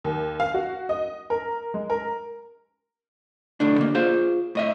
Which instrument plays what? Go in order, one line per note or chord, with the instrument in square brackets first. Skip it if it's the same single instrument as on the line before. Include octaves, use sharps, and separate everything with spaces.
[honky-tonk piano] D#2
F5
F#4
D#5
A#4
G#3
A#4
[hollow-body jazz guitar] B1 A2 D3 D4
D3 A#3
F4 G#4 C5 F5
A2 D#5 E5